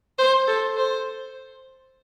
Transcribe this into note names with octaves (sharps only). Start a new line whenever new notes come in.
C5
A4
C5